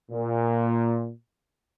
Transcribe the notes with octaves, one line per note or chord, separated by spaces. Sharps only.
A#2